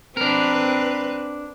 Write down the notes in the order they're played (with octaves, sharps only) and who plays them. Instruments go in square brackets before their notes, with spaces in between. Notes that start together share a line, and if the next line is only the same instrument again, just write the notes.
[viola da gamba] C4 B4 [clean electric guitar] D4 A#4